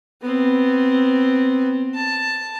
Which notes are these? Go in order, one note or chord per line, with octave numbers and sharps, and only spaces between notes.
B3 C4
A5